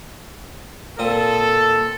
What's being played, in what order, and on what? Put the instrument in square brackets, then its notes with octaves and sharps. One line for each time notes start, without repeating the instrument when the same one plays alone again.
[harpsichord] A#2 C4 D#6 [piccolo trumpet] A4